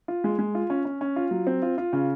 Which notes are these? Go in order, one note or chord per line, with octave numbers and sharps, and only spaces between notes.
F4
G#3
G#3
F4
C#4
C#4
C#4
F4
F#3
C4
F4
F4
C#3